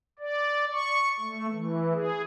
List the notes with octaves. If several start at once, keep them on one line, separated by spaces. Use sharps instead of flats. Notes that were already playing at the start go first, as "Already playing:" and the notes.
D5
C#6
A3
E3
G#4